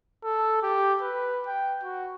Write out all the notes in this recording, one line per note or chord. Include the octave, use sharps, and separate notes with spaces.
A4
G4
B4
G5
F#4